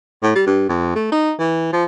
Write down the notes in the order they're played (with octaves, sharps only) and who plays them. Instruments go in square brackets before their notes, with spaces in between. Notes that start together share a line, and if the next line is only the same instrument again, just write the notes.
[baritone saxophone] A2
G3
G2
F2
A3
D#4
E3
F3